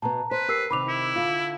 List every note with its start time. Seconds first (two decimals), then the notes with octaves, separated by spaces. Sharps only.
0.02 B2 B3 A5 A#5
0.31 B4 C5
0.48 G4 A#4 E6 C7
0.71 C3 D#3 B5 D6 F7
0.88 E4
1.16 D3 F4